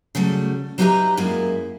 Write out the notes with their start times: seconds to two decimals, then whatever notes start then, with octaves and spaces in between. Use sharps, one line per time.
0.15 C#3 F#3 G3 A3
0.78 F#3 D#4 G4 B4 E5 A#5
1.17 F#2 G#3 A#3 E4